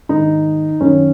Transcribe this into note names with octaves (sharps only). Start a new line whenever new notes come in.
G#2 D#3 D#4
F#2 D#3 C#4